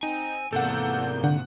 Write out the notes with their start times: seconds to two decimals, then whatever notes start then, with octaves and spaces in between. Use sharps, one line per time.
0.03 C4 D#4 G#5
0.53 E2 G#2 C3 A#3 A4 F#5 G6
1.24 D3 F#5